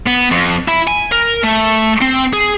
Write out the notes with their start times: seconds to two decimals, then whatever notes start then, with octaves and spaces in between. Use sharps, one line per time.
0.07 B3
0.31 F2
0.68 E4
0.88 G#5
1.12 A#4
1.44 A3
2.01 C4
2.33 G#4